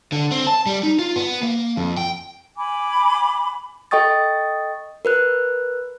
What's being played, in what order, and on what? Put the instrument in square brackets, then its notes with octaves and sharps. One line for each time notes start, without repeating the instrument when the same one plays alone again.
[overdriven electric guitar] D3
C4
A5
G3
D#4
F4
B3
A#3
F2
G5
[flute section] G#5 B5 D6
[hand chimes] A4 D#5 G5 C#6 D#6 A6
A#4 B4 F#6